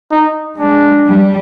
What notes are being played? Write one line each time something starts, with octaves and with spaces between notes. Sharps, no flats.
D#4
G#3 D4
G3